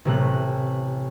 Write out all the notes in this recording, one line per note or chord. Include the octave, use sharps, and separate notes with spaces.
A1 C3 A3 F#6